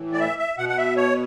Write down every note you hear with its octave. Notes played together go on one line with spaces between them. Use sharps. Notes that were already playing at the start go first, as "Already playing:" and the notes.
Already playing: A2 E3
D5
E5
E5
B2 F#5
F#5
E5
C#5